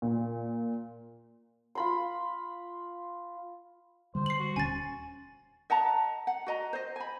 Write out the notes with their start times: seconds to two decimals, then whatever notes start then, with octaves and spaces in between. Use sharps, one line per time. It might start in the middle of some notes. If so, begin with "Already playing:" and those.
0.02 A#2
1.75 F4 B5 C6
4.15 D3 G3 C5
4.26 C7 F#7
4.39 F#4
4.56 D#1 C#4 G#5 A6
5.70 D#5 F#5 A5 A#5
6.27 F#5
6.47 F#4 D#5 A#5
6.73 C5 D#5
6.96 G#5 B5